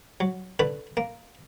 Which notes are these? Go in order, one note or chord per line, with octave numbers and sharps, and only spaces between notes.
F#3
D3 B4
A#3